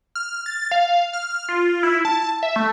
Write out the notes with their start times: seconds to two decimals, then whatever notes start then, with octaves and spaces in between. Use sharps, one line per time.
0.15 F6
0.46 A6
0.71 F5
1.13 F6
1.49 F4
1.83 E4
2.05 A5
2.43 E5
2.56 A3